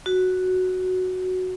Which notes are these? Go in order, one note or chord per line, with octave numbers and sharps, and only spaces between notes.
F#4